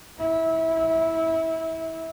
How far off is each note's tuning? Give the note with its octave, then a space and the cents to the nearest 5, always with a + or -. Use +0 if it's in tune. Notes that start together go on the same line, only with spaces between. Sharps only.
E4 -25